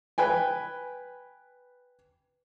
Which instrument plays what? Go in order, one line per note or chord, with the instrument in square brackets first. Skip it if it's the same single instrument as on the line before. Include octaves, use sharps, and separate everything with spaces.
[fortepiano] B4 G5 G#5